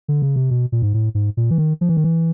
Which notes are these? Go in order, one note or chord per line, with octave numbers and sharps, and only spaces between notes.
D3
C#3
C3
B2
A#2
G#2
A2
G#2
A#2
E3
D#3
F3
E3
D#3
E3